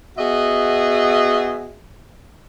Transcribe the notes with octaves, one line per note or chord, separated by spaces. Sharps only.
B3 F#4 G#4 D#5 E5